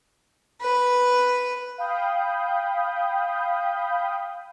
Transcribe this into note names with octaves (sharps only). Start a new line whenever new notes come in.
B4
F5 G5 B5 D#6 G6